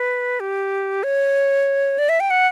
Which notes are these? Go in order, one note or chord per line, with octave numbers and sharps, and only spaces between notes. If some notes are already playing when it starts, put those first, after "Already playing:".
Already playing: B4
G4
C#5
D5
E5
G5
F#5